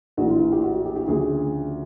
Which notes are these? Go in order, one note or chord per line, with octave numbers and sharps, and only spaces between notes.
A#1 A2 E3 F#4
F4
F4
G4
F#4
F#4
G4
G4
D2 C#3 F3 G#4